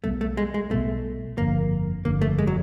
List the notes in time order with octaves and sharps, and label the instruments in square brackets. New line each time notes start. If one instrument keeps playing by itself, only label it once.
[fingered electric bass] B1 B2 G3 B3 [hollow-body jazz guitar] A3
[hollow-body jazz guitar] A3
G#3
G#3
[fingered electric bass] B1 B2 G3 B3 [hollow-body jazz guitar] A3
[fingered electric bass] G1 F2 D3 [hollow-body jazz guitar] A#3
[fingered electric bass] G1 F2 D3 [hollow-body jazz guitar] A#3
[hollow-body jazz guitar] A3
G#3
F#3